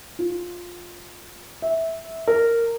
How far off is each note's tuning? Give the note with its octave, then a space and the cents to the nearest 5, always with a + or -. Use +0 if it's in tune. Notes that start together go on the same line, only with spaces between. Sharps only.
F4 +10
E5 -15
A#4 -10